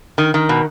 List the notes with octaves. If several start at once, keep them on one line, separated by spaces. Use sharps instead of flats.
D#3
D#3
B2